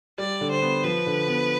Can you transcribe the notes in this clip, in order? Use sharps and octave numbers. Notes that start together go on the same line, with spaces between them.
G3 D5
D3
C5
B3
F3 B4
D3
B3